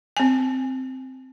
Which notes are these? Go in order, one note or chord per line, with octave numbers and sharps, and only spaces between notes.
C4 G#5